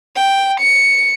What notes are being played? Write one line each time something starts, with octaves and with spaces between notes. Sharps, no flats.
G5
C#7